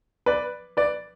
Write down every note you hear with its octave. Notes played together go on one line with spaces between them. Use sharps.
B4 D5
B4 D5